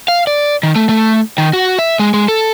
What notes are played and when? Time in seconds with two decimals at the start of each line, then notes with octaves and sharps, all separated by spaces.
0.08 F5
0.27 D5
0.63 D#3
0.76 A3
0.89 A3
1.38 D#3
1.53 F#4
1.79 E5
1.99 G#3
2.14 G#3
2.28 A4